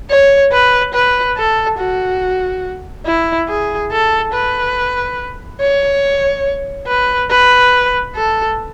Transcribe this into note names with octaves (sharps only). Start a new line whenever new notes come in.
C#5
B4
B4
A4
F#4
E4
G#4
A4
B4
C#5
B4
B4
A4